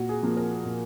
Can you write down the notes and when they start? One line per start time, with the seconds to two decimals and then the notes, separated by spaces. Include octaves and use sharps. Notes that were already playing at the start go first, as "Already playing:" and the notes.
Already playing: A#2 F#4
0.09 G#4
0.23 F3 A#3
0.37 A#4
0.65 A#2